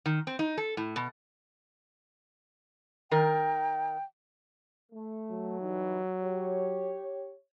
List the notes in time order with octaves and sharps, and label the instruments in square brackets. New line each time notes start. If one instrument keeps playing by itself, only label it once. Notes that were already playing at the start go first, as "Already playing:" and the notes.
[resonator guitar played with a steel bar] D#3
C4
D#4
A4
A2
B2
[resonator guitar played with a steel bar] D#3 A#4 [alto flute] G5
[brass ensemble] A3
[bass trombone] F#3
[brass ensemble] E3 G3 D#4
G4 C#5